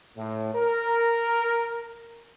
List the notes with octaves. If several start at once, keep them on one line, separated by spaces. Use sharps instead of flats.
A2
A#4